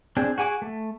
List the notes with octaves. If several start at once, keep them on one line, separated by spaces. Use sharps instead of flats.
C4 D4 G#4
F#4 G#4 G#5 D6
A3